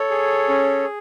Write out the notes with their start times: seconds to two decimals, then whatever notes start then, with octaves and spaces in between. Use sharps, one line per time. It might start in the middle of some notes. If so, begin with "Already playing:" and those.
Already playing: A4 C#5
0.10 G#4
0.49 C#4